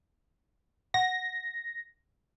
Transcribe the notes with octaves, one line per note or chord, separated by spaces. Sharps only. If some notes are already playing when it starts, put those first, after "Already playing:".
F#5 A#6